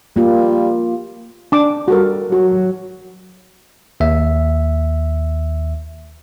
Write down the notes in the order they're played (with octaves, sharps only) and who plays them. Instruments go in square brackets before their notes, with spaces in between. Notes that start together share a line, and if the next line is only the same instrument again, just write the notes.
[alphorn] G3 [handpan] A#3 F4
[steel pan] D4 D6
[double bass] G3 [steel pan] F#4 A4 A#4
[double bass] F#3 [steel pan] F#4
[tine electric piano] D#2 E5